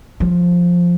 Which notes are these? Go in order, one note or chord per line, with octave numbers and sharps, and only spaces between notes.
F3